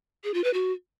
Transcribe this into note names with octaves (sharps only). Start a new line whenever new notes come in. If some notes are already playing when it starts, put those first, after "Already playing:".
G#4
F4
B4
F#4